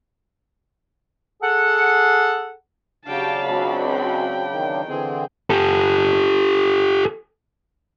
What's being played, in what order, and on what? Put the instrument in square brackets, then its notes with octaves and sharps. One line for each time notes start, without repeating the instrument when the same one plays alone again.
[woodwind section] G#4 A4 F#5
[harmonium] C#3 F#3 D4 [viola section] G4 C#5 G5 [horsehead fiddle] F5 A5
[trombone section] C#2 [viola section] C4 F#4 B5
[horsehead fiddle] G5
[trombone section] E2 D#3
[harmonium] D3 E3 C4 [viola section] G#4
[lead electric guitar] G4 A4